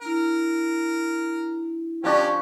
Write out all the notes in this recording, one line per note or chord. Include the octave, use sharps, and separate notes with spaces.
D4 E4 A#4
F3 C#4 D4 G4 C#6